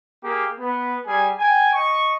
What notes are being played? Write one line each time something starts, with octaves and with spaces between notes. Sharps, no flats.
A#3 G4 G#4
B3
G3 G#4 G#5
G5 G#5
D#5 C#6